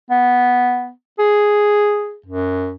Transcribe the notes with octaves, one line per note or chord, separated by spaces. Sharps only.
B3
G#4
F#2